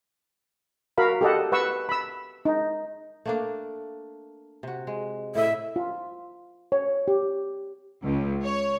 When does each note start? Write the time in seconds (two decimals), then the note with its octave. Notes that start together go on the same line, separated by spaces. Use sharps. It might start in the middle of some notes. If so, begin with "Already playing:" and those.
0.98 F#4 A#4 F5 B5
1.21 G4 A4 D#5 F#5
1.52 B4 F#5 C#6 E6
1.89 B5 E6
2.45 D#4
3.26 A3 A#3 D4
4.63 C3 F#4
4.87 G#3
5.35 A2 D#5 E5
5.76 F4
6.72 C#5
7.08 G4
8.03 C#2
8.44 C#5